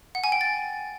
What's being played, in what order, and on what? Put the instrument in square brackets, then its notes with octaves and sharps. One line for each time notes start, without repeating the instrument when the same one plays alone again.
[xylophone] F#5
G#5
G5
A6